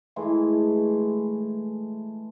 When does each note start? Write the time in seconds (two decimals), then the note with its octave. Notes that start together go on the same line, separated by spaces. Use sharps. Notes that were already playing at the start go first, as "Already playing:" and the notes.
0.16 E3 G#3 A3